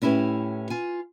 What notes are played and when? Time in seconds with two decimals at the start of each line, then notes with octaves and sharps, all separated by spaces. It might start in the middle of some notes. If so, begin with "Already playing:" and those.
0.02 A2 C#4 E4 G4 B4
0.70 F4 G#5